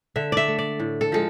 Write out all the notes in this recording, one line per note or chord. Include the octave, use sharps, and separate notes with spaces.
D3 E5
D5 E5
A3
D5
A2
A4
F3 G#3 A4